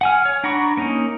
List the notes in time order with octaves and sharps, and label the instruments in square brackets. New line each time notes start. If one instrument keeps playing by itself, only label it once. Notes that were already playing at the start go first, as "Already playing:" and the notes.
[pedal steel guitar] F#5 G#5 F6
C#5
D4 F#5 A#5 B5 C#6
A#3 C#4 D#4